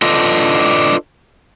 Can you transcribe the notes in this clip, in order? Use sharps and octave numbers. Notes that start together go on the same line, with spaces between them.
D4 F4 A4 B4 D#5